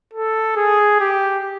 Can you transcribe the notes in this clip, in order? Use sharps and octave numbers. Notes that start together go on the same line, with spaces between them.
A4
G#4
G4